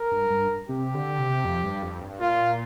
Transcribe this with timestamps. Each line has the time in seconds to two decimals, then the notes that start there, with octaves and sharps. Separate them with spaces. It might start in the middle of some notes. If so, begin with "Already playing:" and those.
Already playing: A#4
0.12 G2
0.30 G2
0.68 C3 G4
0.94 D3
1.19 C3
1.45 F2
1.63 G2
1.82 F2
2.01 G2
2.20 A#2 F4